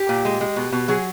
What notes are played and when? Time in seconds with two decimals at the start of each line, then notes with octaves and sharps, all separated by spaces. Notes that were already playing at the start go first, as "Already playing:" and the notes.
Already playing: G4
0.09 A#2
0.25 G#3
0.41 G#3
0.56 B2
0.72 B2
0.88 F#3 G#4